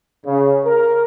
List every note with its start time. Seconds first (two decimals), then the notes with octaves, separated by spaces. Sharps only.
0.24 C#3
0.65 A#4